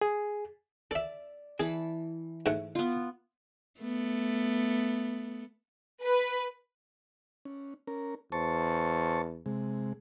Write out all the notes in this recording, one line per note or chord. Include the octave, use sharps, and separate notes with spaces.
G#4
A4 D5 E5
E3 G#4 A5 B5
G#2 A3 F#5
B3 F4
A3 B3
B4
C#4
C#4 A#4
E2 C5 A5 C#6
C3 G#3